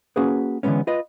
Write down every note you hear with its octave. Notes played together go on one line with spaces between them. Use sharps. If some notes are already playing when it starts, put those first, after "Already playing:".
A#3 C#4 F#4 G#4 B4
D3 E3 F3 G#3 B3 C#4
F4 B4 D#5